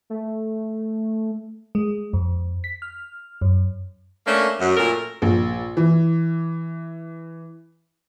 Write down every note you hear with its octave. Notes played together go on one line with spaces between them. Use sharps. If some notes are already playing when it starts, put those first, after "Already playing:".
A3
G#3
F2
B6
F6
F#2
A3 A#3 C#4 D4
F#2
A#2 A3 A#4
A#1
E3